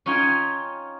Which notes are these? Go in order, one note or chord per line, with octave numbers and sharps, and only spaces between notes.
C#4 D#4 F4 C#5 G5 G#5